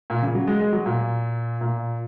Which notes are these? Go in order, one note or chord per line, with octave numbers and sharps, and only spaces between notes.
A#2
C#3
F#3
G#3
G#3
F#3
A#2
A#2